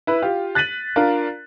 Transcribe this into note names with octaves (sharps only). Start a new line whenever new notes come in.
E4 B4
F4 G4
F#6 A6 B6 D#7 F#7
D4 F4 A#4